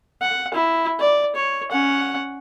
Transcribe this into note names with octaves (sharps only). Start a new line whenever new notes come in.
F#5
E4
D5
C#5
C#4 F#5